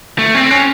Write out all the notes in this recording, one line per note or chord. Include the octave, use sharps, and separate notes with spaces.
A3
C4
C#4